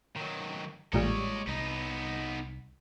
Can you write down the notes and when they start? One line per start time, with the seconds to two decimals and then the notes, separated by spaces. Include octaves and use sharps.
0.16 D#3 F#3
0.93 A1 A#2 G3 G#3 C#5 D#5
1.47 C2 B3 D#4